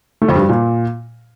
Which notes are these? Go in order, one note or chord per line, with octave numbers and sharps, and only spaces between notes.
A3
F2
G2
G3
A#2